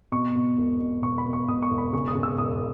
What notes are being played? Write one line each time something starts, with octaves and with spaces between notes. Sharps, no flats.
B2 C#6
B2
E1
B2
E1 C#6
B5
B2
C#6
B2 D#6
C#6
E1
B5
C#3 C#6
D#6
C#3
E6
E1 D#6